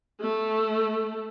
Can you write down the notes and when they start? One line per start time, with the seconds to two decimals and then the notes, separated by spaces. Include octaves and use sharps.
0.21 A3